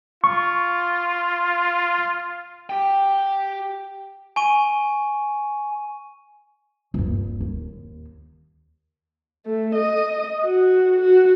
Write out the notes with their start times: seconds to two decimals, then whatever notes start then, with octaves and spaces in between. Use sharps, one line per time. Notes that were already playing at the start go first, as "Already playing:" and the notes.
0.24 F4 C#6
2.70 G4 G5
4.36 G#5 C#6 D#7
6.94 D#1 G2
7.40 D#2
9.46 A3
9.75 D#5
10.44 F#4
11.01 F#4